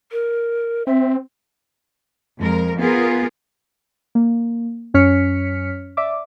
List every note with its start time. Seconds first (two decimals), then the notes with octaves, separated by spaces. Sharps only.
0.12 A#4
0.87 C4 E5
2.37 F2 G#3 A#4
2.78 B3 F4 G#4 A#4
4.15 A#3
4.94 F#2 C#4 C#5 F6 B6 C#7
5.97 D5 E5 D6